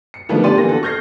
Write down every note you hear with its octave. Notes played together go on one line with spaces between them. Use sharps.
C#7
D3 D#3 F3 G3 A3 B3
G4 D5 C6 D#7
D3 E3 A#3 A#6
F#4 A4
C#6 F6 G6 G#6 A#6 C7